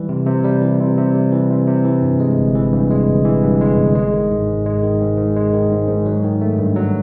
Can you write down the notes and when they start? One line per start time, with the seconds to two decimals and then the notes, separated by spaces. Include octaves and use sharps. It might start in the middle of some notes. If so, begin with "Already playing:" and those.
Already playing: E3 G3
0.09 C3
0.26 C3
0.44 G3
0.62 E3
0.80 C3
0.97 C3
1.14 G3
1.32 E3
1.50 C3
1.67 C3
1.84 E3
2.02 G2
2.20 G#3
2.38 G1
2.55 E3
2.73 G2
2.91 G#3
3.07 G1
3.25 E3
3.43 G2
3.61 G#3
3.78 G1
3.95 G#3
4.13 D#3
4.31 G#2
4.48 G#2
4.66 G#3
4.83 D#3
5.01 G#2
5.18 G#2
5.36 G#3
5.53 D#3
5.71 G#2
5.88 G#2
6.06 F#3
6.24 D#3
6.41 A3
6.58 G2
6.76 F#3